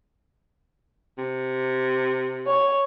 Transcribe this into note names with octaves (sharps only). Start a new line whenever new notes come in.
C3
C#5